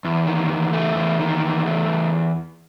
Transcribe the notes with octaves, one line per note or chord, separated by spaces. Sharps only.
E2
D#3
E2
A3
E2
D#3
E2
A3
E2